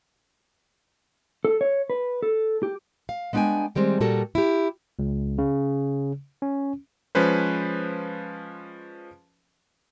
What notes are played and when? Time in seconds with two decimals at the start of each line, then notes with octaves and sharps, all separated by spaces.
1.45 A4
1.61 C#5
1.90 B4
2.23 A4
2.63 G4
3.09 F5
3.33 G#3 B3 D4 F5 G5 G#5
3.75 D#3 G3 G#3 C4
4.00 A#2 G3 F#4 A4 A#4 A5
4.35 E4 G4
4.99 C#2
5.38 C#3
6.42 C#4
7.15 F3 G#3 C#4 B4 C5